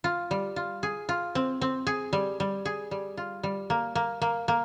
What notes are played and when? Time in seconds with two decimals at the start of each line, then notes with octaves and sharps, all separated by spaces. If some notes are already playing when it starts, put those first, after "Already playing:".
0.04 F4
0.31 G3
0.56 F4
0.83 G#4
1.09 F4
1.35 C4
1.61 C4
1.87 G#4
2.13 G3
2.40 G3
2.65 G#4
2.91 G3
3.17 F4
3.43 G3
3.70 A#3
3.95 A#3
4.22 A#3
4.48 A#3